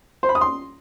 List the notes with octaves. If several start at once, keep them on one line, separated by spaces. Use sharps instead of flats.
C5
B5
D#6
C6